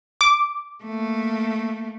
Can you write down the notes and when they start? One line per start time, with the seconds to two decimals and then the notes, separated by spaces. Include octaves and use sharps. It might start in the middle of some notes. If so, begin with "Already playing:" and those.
0.21 D6
0.84 A3 A#3